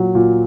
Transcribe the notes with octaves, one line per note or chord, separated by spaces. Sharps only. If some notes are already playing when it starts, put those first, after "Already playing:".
Already playing: A#2 F#3
A#2